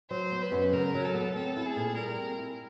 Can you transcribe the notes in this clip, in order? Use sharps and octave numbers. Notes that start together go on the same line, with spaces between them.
F#3 C5
B3
B4
F#2
C#3 A#4
F#3
A4
B3
C4 A4
E4
G#4
A#2
G3 A#4
C4
E4